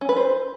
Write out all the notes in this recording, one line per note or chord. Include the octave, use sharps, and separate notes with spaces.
C#4
B4
C5